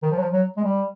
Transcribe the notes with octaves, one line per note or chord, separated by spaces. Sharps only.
D#3
F3
F#3
F3
F#3
G#3
G3